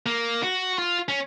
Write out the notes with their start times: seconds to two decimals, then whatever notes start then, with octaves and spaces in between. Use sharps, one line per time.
0.06 A#3
0.43 F#4
0.78 F4
1.09 C#4